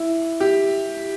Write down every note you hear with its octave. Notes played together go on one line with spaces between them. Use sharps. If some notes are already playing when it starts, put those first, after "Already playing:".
Already playing: E4
G4